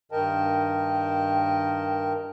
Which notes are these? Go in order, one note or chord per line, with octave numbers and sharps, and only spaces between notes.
G2 D#3 A#4 D#5 G5 A5